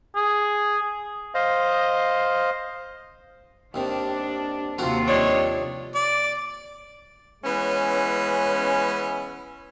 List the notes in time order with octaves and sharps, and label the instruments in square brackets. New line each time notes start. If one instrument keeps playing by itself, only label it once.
[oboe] G#4
[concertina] C5 D#5 F5
[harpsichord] D#2 C3 D#3 [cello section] D4
[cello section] D#2 C3 F4 [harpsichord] C4 F#4 A#4
[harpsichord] G2 F3 D5 [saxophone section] D4 D#4 C#5
[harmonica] D5
[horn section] E3 G#3 B3 C#4